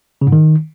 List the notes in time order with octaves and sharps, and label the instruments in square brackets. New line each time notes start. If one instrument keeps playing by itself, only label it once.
[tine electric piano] C#3
G#2
D#3